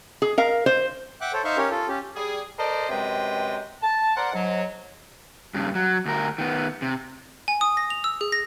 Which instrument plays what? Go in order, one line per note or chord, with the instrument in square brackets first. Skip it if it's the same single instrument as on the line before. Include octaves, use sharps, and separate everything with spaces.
[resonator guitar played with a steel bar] G#4
A#4 F5
C5
[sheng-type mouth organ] E5 F#5 G5 D6 F#6
A4 C5 C#5
D#4 C5 E5 F5 C6 C#6
C#4 G4 A#4 C#5
F4 A4
C#4 G4
[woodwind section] G3 G#4
A4 A#4 C5 D5 D#5
F#2 C3 G#3 B4 G5
A5
A#4 C5 D5 F#5
G#2 F#3
[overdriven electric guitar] G2 C#3
F#3
D2 A#4
D#3 B3
C3
[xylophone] G#5
D#6
A#6
F7
E6
G#4
A#6